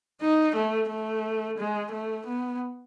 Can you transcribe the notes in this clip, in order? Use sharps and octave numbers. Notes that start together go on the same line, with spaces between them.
D#4
A3
A3
G#3
A3
B3